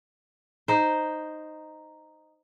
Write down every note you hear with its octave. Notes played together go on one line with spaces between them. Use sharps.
D#4 C5